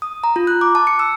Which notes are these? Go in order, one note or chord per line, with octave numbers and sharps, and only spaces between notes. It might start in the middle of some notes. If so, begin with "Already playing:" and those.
D#6
A#5
F4
F#6
D6
A5
C#7
E6